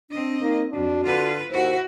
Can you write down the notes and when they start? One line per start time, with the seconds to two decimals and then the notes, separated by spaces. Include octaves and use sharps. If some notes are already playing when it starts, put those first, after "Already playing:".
0.11 C4 D4 D#5
0.41 A#3 D#4
0.72 F2 D4 F#4
1.05 D3 F4 B4
1.50 D#2 E4 F#4 C5